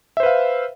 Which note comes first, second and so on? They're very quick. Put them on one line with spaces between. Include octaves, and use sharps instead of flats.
E5 C5 B4 F5